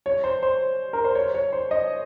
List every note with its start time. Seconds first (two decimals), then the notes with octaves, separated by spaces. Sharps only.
0.06 C#5
0.24 C5
0.43 C5
0.93 A#4
1.04 C5
1.15 C#5
1.34 C#5
1.53 C5
1.71 D#5